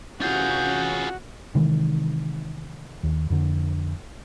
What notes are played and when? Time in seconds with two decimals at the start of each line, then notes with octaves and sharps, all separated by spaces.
0.21 C3 E3 C#4 F4 F#4 G#4 G6
1.55 C3 D#3 E3 G#3
3.03 D#2
3.30 F2 D3